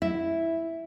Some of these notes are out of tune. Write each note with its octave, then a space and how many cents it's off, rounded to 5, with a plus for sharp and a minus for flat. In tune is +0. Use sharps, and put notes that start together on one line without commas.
E4 +0 E5 +0